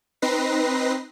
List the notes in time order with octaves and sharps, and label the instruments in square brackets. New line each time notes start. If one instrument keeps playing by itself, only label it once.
[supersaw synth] C4 D#4 B4 A#6 C7